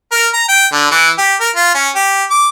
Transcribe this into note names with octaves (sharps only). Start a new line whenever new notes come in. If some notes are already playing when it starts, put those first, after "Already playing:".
A#4
A#5
G5
D3
E3
G4
A#4
F4
C#4
G4
D6